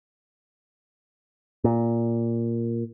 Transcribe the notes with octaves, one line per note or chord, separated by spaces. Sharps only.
A#2